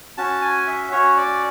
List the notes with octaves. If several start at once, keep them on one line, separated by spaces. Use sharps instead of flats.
C#4 F#4 A5
G#5
E5
C#4 F#4 C#5
D5